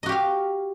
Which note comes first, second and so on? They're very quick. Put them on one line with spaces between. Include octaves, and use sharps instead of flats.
D#5 F#4 G4 F5